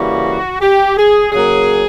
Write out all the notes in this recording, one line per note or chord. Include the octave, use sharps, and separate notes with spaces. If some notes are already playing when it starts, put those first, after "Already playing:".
Already playing: C#3 E3 G3 A#3 F#4
G4
G#4
C#3 F#3 A#3 G#4